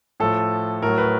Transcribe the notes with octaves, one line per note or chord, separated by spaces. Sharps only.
A2 F3 A4
A2 F#3 A#4
B4